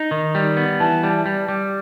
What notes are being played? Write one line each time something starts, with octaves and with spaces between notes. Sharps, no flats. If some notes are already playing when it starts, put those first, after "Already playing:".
Already playing: D#4
D#3
G3
B3
E3 A5
G3
G3
G3